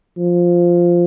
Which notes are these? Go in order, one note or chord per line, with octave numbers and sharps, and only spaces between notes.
F3